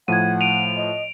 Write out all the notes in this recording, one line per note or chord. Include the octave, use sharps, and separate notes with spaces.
A2 F3 F#5 G#6 D#7
D7 D#7 F7
D#5